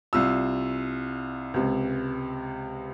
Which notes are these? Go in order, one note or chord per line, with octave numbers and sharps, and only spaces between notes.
C2 F4 E6
C#2 C3